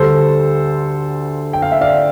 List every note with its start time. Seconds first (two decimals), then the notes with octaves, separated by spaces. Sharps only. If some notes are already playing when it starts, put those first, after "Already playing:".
Already playing: D2 D3 G3 A4 C5
1.53 G5
1.62 F5
1.72 E5
1.81 D5 F5